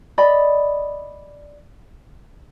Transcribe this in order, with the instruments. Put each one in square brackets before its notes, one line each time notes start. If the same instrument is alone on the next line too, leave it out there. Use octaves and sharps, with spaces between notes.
[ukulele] D5 D#5 B5